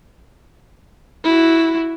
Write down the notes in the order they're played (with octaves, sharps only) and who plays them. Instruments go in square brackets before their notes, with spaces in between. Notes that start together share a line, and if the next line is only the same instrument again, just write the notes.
[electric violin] E4 F#4